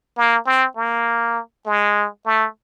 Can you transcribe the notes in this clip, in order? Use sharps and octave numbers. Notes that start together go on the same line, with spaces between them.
A#3
C4
A#3
G#3
A3